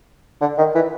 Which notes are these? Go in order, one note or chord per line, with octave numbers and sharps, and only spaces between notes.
D3
D#3
E3